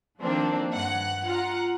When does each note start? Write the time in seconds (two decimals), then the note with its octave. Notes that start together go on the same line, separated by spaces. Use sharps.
0.19 D#3 F3 A#3 C4 D4
0.74 G2 F#5
1.25 F4 F#5 A#5